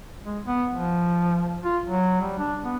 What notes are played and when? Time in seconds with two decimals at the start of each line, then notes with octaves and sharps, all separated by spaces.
0.24 G#3
0.46 B3
0.73 F3
1.64 F4
1.85 F#3
2.21 G3
2.39 D4
2.64 B3